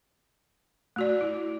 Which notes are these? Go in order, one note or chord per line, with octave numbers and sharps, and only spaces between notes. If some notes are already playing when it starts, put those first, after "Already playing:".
A3 F#4 D5
E4